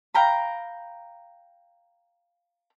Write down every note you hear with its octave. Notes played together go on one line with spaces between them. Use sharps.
F5 G5 A#5 B5